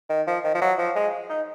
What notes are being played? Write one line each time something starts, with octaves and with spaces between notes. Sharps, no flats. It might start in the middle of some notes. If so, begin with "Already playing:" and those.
D#3
F3
D#3
F3
F#3
F3
G#3
D#4